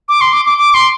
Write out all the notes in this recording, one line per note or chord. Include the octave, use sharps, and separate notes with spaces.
D6
C6
D6
D6
D6
C6